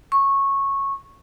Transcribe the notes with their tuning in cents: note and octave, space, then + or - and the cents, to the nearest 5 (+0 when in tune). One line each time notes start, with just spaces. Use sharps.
C#6 -15